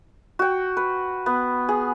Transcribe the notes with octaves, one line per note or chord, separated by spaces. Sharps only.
F#4 G5
B4
B3
G#4